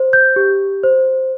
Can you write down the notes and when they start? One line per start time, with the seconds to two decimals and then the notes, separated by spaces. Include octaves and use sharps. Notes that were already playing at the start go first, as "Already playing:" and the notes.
Already playing: C5
0.13 G6
0.36 G4
0.84 C5